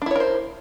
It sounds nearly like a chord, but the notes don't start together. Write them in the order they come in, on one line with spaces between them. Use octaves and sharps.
D4 E4 C#5 A#4 C5